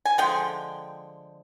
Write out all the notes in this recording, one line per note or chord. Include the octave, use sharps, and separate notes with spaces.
G#5
D3 F3 G#3 G5